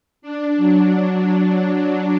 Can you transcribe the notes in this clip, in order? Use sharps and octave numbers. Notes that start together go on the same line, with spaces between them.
D4
F#3